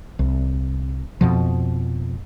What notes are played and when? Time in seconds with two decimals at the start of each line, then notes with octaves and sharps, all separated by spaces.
0.19 C2
1.21 F2 B2 F3